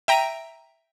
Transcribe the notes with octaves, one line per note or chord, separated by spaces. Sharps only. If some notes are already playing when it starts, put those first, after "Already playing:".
E5 G5 A#5 A#6 D7 D#7